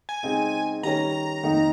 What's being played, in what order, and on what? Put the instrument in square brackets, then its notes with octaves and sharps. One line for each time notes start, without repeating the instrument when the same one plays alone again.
[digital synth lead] G#5
[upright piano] C#3 G#3 C4 D#4
[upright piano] D#3 G3 C#4 [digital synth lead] A#5
[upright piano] F2 D#3 A#3 D#4